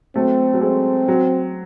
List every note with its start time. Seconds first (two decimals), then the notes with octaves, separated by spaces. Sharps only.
0.15 F#3 A3 C4
0.54 F#3
0.61 G#3 C4
1.08 F#3